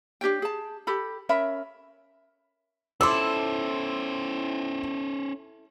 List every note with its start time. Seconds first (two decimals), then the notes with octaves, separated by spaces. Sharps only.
0.21 D4 G4 C#5 G5
0.42 G#4 A5
0.87 G4 A4 B5
1.29 C#4 A#4 E5 B5
3.01 C#4 E4 A4 C5 C6 D6 E6